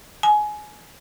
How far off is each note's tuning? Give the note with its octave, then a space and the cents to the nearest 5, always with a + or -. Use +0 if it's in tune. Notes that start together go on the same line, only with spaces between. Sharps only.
G#5 +20